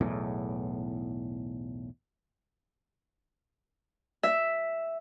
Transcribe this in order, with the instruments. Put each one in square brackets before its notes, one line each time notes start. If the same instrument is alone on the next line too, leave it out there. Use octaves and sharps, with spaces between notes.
[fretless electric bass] B1 E2 A2
[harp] E5